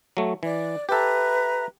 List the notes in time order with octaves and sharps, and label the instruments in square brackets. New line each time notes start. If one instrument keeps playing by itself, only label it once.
[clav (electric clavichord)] F#3 A3
[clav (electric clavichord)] E3 [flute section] D5
[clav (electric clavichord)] G4 A4 [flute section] B4 E5 A#5